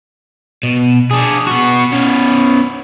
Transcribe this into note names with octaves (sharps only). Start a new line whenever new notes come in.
B2
D4 G#4
B3 F#4
B3 C#4